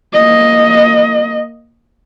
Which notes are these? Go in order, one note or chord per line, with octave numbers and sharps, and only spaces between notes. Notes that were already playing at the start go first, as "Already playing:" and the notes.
A#3 D#5